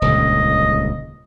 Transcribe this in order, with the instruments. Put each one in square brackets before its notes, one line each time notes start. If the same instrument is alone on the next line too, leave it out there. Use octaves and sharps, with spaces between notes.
[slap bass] D#1 C#2 D3 [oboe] D#5